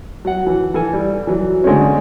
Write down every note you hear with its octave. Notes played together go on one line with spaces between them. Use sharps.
F#3 F#5
E3
E3 A4 G#5
G3
E3 F#3
D3 G#3 A3 C4 C#4